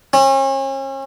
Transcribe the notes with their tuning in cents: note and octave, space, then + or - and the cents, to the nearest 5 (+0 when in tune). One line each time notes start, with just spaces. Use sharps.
C#4 -40